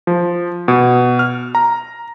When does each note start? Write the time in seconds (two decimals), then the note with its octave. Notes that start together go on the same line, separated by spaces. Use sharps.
0.07 F3
0.68 B2
1.19 F6
1.55 A#5